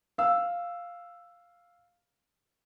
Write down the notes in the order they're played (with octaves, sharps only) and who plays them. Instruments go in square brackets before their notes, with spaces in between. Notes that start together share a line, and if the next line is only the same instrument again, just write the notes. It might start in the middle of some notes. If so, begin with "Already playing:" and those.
[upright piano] F5 E6